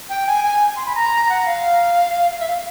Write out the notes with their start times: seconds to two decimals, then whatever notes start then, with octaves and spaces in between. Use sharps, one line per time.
0.09 G5
0.27 G#5
0.44 G#5
0.76 C6
0.86 B5
0.95 A#5
1.29 F#5
1.45 F5
2.31 F5
2.40 E5
2.48 F5